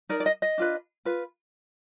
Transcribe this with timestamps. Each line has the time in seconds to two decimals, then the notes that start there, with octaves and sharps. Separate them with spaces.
0.09 D#4 A#4 D5
0.20 D5
0.26 D#5
0.42 D#5
0.58 D4 F4 B4
1.05 F4 B4